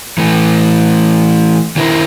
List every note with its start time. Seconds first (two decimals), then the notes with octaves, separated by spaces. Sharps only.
0.18 E3 A3
1.76 D#3 F#3 E4 A4 A#4 C5